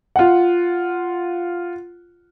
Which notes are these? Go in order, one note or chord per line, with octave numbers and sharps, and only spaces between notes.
F4 F#5